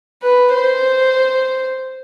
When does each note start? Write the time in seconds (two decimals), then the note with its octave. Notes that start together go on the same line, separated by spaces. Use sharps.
0.23 B4
0.53 C5